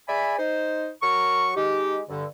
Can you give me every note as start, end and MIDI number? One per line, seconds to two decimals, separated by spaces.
0.08 0.36 68
0.08 0.36 74
0.08 0.36 76
0.08 0.36 80
0.08 0.36 83
0.38 0.90 63
0.38 0.90 72
1.01 1.51 54
1.01 1.51 70
1.01 1.51 85
1.56 2.00 56
1.56 2.00 63
1.56 2.00 67
2.08 2.25 43
2.08 2.25 50